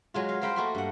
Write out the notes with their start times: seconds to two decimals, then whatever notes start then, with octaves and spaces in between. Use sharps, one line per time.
0.14 F#3 G#3 F4
0.29 F5
0.41 A#4 C5 F5 G5 B5 C6
0.56 A3 A#3 F#4 B5 C6
0.75 G2 F#5